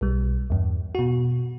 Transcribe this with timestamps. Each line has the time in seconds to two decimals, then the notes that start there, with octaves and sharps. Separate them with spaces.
0.01 B1 G3
0.50 E2 G2
0.95 B2 F#4